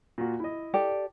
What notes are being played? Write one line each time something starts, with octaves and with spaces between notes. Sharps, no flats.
A#2 F4 F#4
E4 D#5
G4 A4 D5